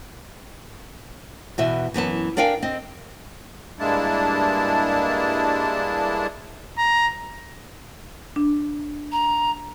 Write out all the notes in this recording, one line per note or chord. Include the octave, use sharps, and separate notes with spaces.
E2 B2 E5 G#5
F#2 E3 B3 A5
D4 A#4 D5 F5 G5 G#5
C4 D#5
G2 G#3 A#3 D4 E4 A5
A#5
D4
A#5